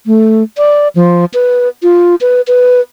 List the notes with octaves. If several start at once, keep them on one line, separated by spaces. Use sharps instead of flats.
A3
D5
F3
B4
F4
B4
B4